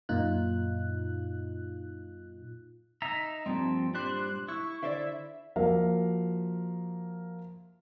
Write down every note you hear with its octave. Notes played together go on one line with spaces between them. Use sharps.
F#2 A#2 D#4 F4 F#6
D#4 E5 A#5
G2 A#2 F3 C4
G3 D4 C5 F#6
E4 C#6
D3 C5 D5 E5
F3 A#3 F#4 A#4 E5 F5